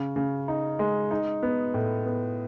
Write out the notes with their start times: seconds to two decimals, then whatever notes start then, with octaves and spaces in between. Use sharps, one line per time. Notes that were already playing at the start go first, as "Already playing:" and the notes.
Already playing: C#3
0.16 C#3
0.48 D#4
0.79 G#3
1.11 D#4
1.43 B3
1.74 A2
2.06 B3